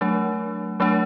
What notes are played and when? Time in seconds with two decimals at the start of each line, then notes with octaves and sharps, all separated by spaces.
0.01 F#3 A3 D4
0.80 F#3 A3 D4